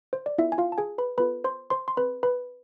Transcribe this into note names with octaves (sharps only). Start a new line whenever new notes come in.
C5
D5
B3 E4 F4 A4 E5
G#5
F4 F5
A5
G#4 G#5
B4 B5
B3 F4 A4 B4 B5
C5 C6
C5 C6
C6
C4 G#4 B4 B5
B4 B5